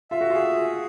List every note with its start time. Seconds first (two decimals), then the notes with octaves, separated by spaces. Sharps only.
0.11 F4 E5
0.21 F#4
0.30 F4 G#4